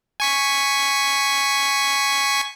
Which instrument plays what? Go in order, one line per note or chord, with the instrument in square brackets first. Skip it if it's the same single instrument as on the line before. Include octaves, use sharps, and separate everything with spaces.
[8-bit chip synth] G#5 C#6 B6